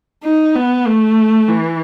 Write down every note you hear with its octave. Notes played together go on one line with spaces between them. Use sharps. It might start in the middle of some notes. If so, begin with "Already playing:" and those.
D#4
B3
A3
E3